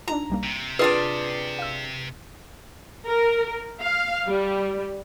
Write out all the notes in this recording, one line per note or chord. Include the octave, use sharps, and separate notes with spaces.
D4 D#4 F4 A#5
B1 G3 A#3
C3
D4 F4 G#4 A#4 B4 D5 G5
F5 E6
A#4
F5
G3